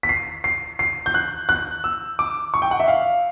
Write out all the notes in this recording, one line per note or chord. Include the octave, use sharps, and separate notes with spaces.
B6
C7
C7
C7
G6
F#6
F#6
E6
D6
C#6
G5
F#5
E5
F5